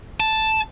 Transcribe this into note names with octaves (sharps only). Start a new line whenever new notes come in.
A5